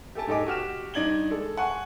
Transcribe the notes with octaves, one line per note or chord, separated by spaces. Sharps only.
G4 A4 G#5 A5
G#2 G4 A4 D#5 G#5 D6
F#4 G4 F6 E7
G2 D#4 D5 G#6 F#7 G7
G#3 A4
F#5 G#5 C#6